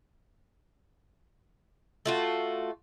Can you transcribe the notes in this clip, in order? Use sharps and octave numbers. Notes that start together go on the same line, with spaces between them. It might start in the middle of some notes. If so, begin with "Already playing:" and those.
A3 F4 F#4